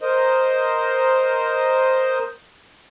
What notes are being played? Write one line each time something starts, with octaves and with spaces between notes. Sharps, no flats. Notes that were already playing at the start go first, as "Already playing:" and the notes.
A#4 C5 D#5